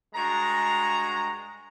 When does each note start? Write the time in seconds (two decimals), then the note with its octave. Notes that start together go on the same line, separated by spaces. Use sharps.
0.14 G2 G#3 F#4 A#5